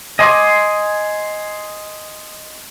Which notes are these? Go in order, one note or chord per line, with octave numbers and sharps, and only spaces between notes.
D#5 G#5 C6 D6